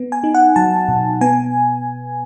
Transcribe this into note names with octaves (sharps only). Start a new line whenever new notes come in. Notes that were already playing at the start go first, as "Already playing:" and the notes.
Already playing: B3
G#5
D#4
F#5
F#3 A5
B2
B3 G#5